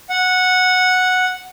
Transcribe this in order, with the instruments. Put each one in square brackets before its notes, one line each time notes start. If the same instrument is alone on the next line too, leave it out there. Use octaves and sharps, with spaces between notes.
[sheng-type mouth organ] F#5